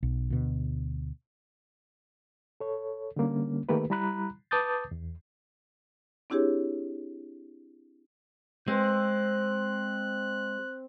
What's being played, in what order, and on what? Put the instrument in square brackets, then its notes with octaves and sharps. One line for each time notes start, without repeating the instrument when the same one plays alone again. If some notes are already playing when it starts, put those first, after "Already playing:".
[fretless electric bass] B1
D2 B2
[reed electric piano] A4 C#5
D3 G3 A#3 C#4
D#3 A3 A#3 G4 A#4 B4
G3 E4 A#5 B5 F#6
B4 A5 D6 D#6 G6 A6
E2
[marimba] C4 D4 E4 G4 G#4 C#5
[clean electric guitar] G#3 [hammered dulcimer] C4 [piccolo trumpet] F#6